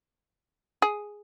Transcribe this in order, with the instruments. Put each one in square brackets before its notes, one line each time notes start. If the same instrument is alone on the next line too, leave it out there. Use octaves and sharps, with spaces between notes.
[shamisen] G#4